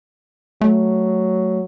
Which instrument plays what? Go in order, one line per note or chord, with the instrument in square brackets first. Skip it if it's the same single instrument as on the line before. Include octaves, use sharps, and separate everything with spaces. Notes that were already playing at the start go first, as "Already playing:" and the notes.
[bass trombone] F#3 [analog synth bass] A3